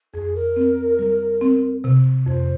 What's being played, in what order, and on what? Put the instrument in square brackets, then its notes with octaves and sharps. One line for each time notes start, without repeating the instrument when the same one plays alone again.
[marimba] F2 [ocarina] G#4
[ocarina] A#4
[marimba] C4
G3
C4
C3
[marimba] F2 [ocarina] C5